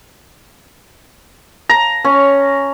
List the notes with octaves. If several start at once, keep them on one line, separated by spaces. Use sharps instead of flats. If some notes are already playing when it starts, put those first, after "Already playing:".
A#5
C#4